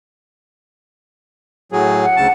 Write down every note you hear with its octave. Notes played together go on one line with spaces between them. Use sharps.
A2 F#3 G#4
F#5
D2 C#3 A5